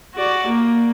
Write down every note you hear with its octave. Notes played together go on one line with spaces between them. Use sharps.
F#4 D5
A#3